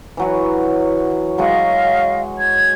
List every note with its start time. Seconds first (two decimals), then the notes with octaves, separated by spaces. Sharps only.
0.17 E3 F#3 F#4
1.38 F#3 G#3 C#5 D#5 F5
2.38 G#6